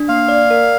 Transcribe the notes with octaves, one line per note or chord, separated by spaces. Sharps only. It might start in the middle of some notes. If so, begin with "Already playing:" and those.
Already playing: D4
A#3 F5
D5
A#4